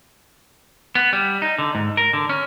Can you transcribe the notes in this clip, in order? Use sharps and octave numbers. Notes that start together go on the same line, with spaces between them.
B3
G3
D#4
D3
G#2
A#4
D3
C#4